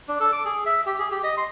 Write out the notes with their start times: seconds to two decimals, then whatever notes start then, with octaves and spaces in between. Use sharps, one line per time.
0.08 D4
0.20 A4
0.32 D6
0.45 G#4
0.66 E5
0.86 G4
0.99 G#4
1.11 G4
1.24 D#5
1.37 C6